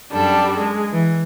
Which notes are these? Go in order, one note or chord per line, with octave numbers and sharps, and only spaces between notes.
F#2 G3 D4 A4
G#3
E3